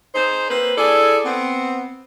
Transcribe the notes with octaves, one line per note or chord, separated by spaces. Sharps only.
D#4 G#4 C5
A#3 C4 B4 C5
E4 G#4 A4 D5
B3 C4